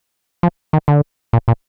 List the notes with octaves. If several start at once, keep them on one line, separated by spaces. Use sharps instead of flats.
F3
D#3
D3
A#2
A#2